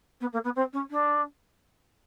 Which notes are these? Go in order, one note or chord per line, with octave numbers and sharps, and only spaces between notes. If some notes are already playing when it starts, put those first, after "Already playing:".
B3
A#3
B3
C4
C#4
D4